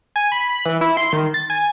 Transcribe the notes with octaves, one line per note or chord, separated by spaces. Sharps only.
G#5
B5
E3
E4
C6
D#3
A6
G#5